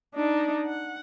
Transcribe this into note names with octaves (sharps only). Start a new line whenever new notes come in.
D4 D#4
F#5